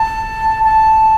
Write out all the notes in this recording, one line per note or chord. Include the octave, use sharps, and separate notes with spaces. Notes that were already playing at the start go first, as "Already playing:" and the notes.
Already playing: A5
A5